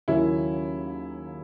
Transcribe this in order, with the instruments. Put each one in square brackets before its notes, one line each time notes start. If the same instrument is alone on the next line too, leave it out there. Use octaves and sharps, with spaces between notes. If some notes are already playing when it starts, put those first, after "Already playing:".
[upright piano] D#2 C#3 F#3 A#3 C#4 E4